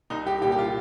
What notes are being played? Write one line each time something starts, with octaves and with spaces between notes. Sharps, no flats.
C2 D#4
G4
A#2 G3 A#3 G4
G4
F4